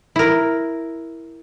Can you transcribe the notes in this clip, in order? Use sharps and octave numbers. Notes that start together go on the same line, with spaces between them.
E4 A#4